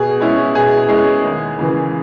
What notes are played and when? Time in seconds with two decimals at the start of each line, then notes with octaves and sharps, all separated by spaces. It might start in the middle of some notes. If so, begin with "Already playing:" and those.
Already playing: B2 G#4
0.20 G#3 C#4 E4
0.55 B2 G#4
0.89 G#3 C#4 E4
1.24 D#2
1.59 C#3 E3